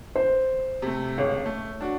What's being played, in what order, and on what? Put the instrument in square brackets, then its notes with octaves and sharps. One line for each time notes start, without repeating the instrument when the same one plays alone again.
[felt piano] C5
[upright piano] C3 A3
[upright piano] G#1 C#2 [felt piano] C#5
[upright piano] A3
D4 F#4